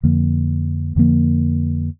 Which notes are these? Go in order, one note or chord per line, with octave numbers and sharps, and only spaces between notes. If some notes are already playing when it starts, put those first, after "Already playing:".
F2 D3 F3 A#3
F2 D3 F3 A#3